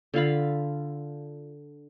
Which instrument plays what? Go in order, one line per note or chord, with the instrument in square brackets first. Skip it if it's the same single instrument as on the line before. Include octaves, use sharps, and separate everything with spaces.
[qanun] D3 F4 F5 B5